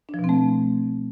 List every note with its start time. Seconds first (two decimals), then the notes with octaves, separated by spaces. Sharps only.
0.09 D4
0.14 F3
0.19 B2
0.24 C4
0.29 A3